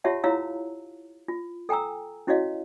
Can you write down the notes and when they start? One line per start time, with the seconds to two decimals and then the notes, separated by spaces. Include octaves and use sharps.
0.04 F4 G4 C#5 E5 F#5 A5
0.24 E4 F4 C#5 F5 A#5 E6
1.28 F4
1.69 A4 G5 G#5 A#5 E6
2.27 C#4 E4 F#4 C#5 D#5 F5